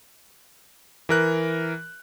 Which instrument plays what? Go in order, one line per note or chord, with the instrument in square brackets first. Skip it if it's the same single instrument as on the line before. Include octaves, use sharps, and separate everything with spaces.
[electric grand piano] E3 A#4 F#6